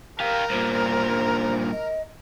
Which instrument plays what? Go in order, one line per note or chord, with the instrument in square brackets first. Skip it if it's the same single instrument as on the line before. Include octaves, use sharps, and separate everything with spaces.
[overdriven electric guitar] G4 F5 [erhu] A#4
[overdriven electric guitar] G2 A#2 [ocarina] C5
[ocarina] D#5